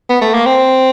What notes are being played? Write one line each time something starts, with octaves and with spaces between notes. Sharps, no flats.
B3
A3
A#3
C4